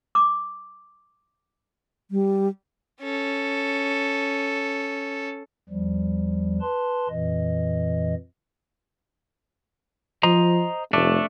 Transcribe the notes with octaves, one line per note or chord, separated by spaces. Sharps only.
D6
G3
C#4 A4
E2 F3 G3
B4 A5 C6
F2 A#2 E3 D#5
F3 C5 D#5 A#5
F1 A3 D4